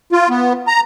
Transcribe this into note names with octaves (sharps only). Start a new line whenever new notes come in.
F4
B3
A#5